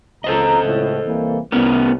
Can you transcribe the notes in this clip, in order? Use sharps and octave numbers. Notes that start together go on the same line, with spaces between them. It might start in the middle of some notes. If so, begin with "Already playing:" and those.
C#2 A4 C5 D#5 A#5
C#2 A2
C2 E3 A#3
C2 B3 C#4 A#4